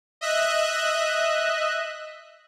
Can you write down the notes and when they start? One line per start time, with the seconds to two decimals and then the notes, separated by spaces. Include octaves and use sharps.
0.21 D#5 E5 F#6